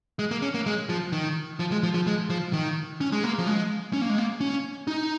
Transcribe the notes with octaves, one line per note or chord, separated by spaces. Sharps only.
G#3
A#3
C#4
A#3
G#3
F3
D#3
F3
G#3
F3
F3
G#3
F3
D#3
C#4
G#3
A#3
F3
G#3
C#4
A#3
G#3
A#3
C#4
D#4